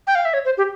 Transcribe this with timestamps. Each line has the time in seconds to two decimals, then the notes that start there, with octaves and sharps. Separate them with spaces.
0.07 G5
0.15 F5
0.25 E5
0.34 C#5
0.45 C5
0.57 G4